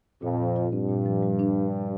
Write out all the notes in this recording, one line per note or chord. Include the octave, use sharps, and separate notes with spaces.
F2 A#2
F3
F4
G2 C4
A#2
F3
G3
D4